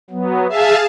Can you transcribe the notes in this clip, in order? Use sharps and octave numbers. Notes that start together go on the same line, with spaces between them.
F#3 B3
G#4 E5 F5 A5